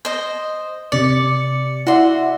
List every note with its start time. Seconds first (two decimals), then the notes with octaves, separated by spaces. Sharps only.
0.05 C5 D#5
0.92 C3 D5 C#7
1.87 E4 F#4 D5 E5 C6